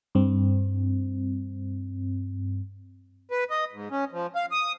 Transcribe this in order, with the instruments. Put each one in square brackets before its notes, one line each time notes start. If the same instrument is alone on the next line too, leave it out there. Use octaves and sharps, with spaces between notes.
[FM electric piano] G2 C4
[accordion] B4
D#5
G#2
C#4
F3
F5
D#6